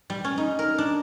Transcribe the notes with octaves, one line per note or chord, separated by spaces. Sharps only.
G3
C#4
D#4
A#4
D4